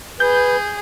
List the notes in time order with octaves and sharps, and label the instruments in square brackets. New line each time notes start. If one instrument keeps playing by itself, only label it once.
[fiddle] G#4 [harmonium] B4 [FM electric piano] G6